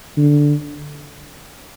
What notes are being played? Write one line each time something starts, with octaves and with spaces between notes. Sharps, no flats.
D3